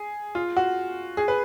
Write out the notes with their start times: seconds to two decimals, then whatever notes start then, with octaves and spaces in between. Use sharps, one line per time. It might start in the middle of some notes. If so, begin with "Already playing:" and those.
Already playing: G#4
0.35 F4
0.57 F#4
1.17 G#4
1.28 B4